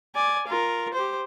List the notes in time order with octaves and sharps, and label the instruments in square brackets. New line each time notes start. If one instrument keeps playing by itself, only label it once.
[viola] D5 G#5
F4 A#4
G4 C5